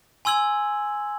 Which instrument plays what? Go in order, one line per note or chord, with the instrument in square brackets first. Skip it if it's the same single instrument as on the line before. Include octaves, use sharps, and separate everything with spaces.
[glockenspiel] G#5 C6 E6 G#6 F#7